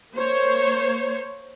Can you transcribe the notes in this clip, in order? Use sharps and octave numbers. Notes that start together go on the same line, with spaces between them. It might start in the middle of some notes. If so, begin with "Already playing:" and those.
A#3 C5 C#5